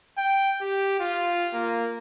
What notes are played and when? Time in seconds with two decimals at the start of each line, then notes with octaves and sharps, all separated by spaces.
0.18 G5
0.61 G4
1.00 F4
1.54 A#3